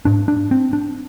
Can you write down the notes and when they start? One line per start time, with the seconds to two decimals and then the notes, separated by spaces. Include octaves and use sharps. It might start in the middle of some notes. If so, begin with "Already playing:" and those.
0.05 G#2 D4
0.28 D4
0.51 C4
0.73 D4